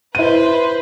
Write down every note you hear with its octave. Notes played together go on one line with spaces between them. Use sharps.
E4 B4 C5 D#7